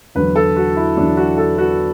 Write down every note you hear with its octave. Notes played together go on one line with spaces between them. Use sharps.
E2 D3 F#3 B4
A4
F#4
E4
E2 D3 F#3 D4
F#4
A4
F#4